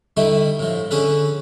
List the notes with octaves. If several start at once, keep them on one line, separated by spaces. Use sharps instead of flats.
D3 G3 A3 D#4 E4
A2 F3
D3 C#4 G#4 A4 B4